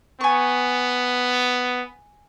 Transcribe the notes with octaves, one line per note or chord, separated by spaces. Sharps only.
B3 G#5 C#6